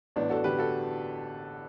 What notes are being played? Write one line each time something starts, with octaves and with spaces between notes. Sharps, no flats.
A1 B3 D4
F#4 A4
D3 G4 B4
F#4 A4